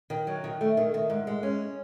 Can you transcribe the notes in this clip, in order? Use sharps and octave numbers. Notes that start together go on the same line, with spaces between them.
D#3
F#3
D#3
A3
D#3
D#3
G#2
G#3
C#4